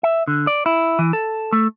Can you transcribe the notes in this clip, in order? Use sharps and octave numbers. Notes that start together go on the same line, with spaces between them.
E5
D3
D5
E4
E3
A4
A3